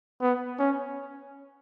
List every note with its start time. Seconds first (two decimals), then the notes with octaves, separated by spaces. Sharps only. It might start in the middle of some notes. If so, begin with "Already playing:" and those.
0.22 B3
0.59 C#4